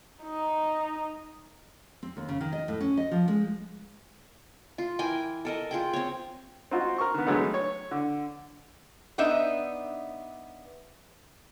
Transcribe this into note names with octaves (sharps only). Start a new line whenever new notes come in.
D#4
C4
D#2
C#3
D#3
D#5
A2
C#4
D#5
F3
G#3
F4
E3 A#4 G5 G#5
A4 A#4 D#5
F4 G#4 G5
C4 C#5
C4 D#4 F4 F#4
A#4 C#6
D#3 B3
D#3 F#3 G#3 A3 B3 D#4
C#5
D3
B3 D4 D#4 E5